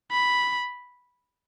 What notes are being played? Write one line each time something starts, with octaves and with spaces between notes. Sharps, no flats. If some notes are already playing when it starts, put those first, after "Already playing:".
B5